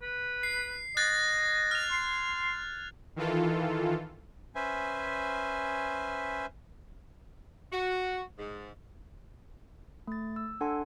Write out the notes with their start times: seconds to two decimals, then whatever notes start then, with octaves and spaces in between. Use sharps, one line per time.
0.02 B4
0.43 C7
0.97 D#5 F#6 G#6 A6
1.71 F6 F7
1.91 C6
3.16 D#3 E3 F4 A4
4.55 C#4 B4 C5 E5 G#5
7.73 F#4
8.38 G#2
10.08 A3 A6
10.36 E6
10.61 D4 A4 F#5 G#5 A5 C6